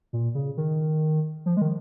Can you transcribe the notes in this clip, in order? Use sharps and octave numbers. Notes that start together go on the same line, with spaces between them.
A#2
C#3
D#3
F3
G#3
D#3